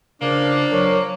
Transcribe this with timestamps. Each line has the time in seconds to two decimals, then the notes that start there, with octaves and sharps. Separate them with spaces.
0.21 C#3 F3 A#3 D4
0.72 F#3 A#4